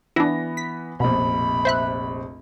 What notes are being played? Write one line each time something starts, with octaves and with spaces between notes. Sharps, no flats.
E3 B3 D4 E4 A#6
B6
F1 A#1 B2 B5
C5 E5 F#6